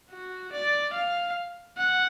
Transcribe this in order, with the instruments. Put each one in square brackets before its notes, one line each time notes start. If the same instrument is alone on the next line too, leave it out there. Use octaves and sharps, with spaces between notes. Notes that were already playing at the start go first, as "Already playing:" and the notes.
[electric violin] F#4
D5
F5
F#5